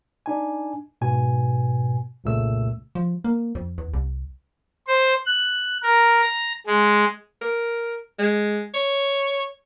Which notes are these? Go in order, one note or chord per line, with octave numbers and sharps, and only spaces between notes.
D4 D#4 G#5
G#2 B2 G#5
C2 F2 A#2 C#3 A3 E6
F3
A#3
F2
E2
C2
C5
F#6
A#4
A#5
G#3
A#4
G#3
C#5